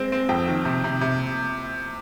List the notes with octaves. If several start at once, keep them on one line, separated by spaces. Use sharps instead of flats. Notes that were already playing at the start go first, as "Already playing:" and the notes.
Already playing: G#3 C4
C4
F2 G5
D#3
C3
C3
C3